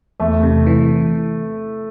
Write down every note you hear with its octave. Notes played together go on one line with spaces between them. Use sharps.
E2 A3
C3
E3